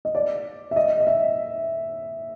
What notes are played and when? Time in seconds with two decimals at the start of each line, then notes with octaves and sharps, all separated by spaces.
0.05 D#5
0.15 D5
0.71 E5
0.76 D#5
1.00 D#5
1.07 E5